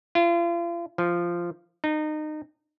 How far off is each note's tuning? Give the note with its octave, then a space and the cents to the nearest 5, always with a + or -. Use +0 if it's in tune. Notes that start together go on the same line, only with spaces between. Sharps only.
F4 -40
F3 -10
D#4 -25